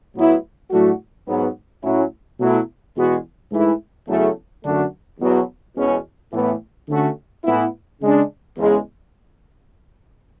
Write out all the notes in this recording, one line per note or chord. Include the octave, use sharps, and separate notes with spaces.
A2 F#3 B3 E4
A2 F#3 A3 D4 F#4
G#2 F#3 B3
A2 F#3 C#4 E4
B2 F#3 A3 E4
E2 B2 G#3 B3 F#4
G#2 E3 A3 E4
E2 C#3 F#3 A3
F#2 D3 A3 D4 F#4
E2 B2 F#3
E2 B2 G#3 C#4
A2 E3 B3
D3 A3 C#4 F#4
A2 E3 B3 E4
C#3 G#3 D4
E2 C#3 G#3